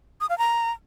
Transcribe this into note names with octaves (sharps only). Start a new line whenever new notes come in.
D#6
F5
A#5